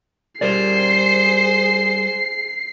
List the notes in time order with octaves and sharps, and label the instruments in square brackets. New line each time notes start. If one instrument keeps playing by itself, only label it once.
[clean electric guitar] G3 A#4 D5 [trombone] G#4 [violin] C5 [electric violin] C7